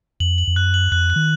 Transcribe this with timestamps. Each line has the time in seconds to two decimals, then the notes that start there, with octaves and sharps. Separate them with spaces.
0.20 F2 F#7
0.38 F#7
0.47 F2
0.56 F#2 F#6
0.74 F#7
0.92 F2 F#6
1.10 F#6
1.16 D#3